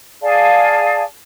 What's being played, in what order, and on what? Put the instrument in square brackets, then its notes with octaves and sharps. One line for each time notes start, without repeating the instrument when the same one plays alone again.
[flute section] G#4 D5 F5 A5